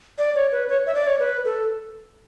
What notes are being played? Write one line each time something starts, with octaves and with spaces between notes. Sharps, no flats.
D5
C#5
B4
C#5
E5
D5
C#5
B4
A4